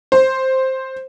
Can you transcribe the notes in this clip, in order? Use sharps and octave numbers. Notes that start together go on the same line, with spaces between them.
C5